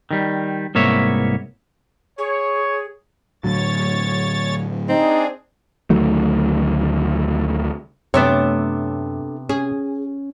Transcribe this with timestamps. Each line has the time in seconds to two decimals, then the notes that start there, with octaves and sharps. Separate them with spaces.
0.11 D#3 G3
0.75 C2 G#2 A#3 B3 C#5 E5
2.18 G#4 C#5
3.44 A2 D3 F#3 C#5 A6
4.89 C4 D4 D#4 G#4
5.90 D2 D#3 F#3 A3
8.14 F#2 C3 A3 B3 D4 C#5
9.49 C#4 G#4